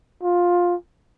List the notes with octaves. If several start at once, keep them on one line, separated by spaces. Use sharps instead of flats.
F4